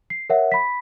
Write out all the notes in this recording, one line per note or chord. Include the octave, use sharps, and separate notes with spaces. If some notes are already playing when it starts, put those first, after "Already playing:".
C7
A#4 C#5 E5 F#5
B5 B6